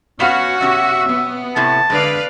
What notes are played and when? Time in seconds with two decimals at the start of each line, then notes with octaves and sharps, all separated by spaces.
0.20 B3 C#4 F#4 F5
0.61 B2 C#4 G4 E5
1.06 B3
1.56 A2 C3 A3 A5
1.90 D3 G#3 B4 D5 F5